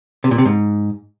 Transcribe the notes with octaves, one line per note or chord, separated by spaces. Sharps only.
C3
A#2
C3
G#2